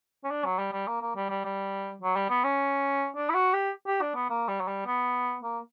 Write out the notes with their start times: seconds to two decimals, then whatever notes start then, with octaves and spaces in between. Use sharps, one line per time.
0.24 C#4
0.31 D4
0.45 F#3
0.59 G3
0.73 G3
0.87 A#3
1.02 A#3
1.16 G3
1.30 G3
1.45 G3
2.02 F#3
2.16 G3
2.30 B3
2.44 C#4
3.16 D4
3.30 E4
3.34 F#4
3.54 G4
3.87 G4
4.01 D4
4.15 B3
4.30 A#3
4.48 G3
4.61 F#3
4.68 G3
4.86 B3
5.43 A#3